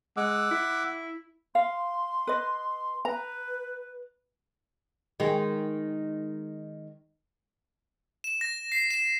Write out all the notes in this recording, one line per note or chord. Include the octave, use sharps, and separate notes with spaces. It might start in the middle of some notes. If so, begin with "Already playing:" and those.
G#3 F#5 D6 E6
E4
F5 C6
B4 D#5
B4 A#5
D#3 G#3
E7
A#6
C7
E7